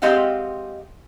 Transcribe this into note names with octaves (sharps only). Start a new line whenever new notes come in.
G#3 C4 G4 D#5 F5 F#5